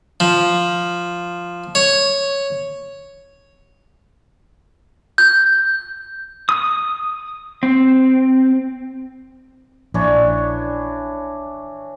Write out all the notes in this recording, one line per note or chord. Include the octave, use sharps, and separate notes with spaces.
F3
C#5
G6
D#6
C4
A#1 E3 D4 C#5